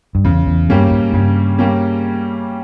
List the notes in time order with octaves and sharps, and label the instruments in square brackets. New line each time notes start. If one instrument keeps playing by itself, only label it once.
[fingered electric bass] G2
[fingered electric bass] E2 [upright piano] C#3
[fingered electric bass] E2
[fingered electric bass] G2 [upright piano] G3 A#3 C#4
[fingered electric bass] G#2
[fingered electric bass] G2 [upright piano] C#3
[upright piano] G3 A#3 C#4